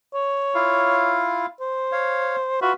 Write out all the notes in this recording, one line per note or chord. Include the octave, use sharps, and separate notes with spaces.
C#5
E4 F4 F5
C5
C#5 F5
F4 F#4 B4 E5